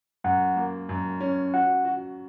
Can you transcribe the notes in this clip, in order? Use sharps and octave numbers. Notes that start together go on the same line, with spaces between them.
F#2 F#5
A#3
F#2
C#4
F#4 F#5
F#4